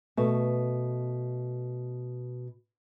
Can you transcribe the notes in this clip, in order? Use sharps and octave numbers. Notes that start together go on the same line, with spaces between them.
B2 A3